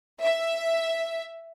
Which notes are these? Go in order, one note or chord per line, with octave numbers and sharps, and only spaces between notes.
E5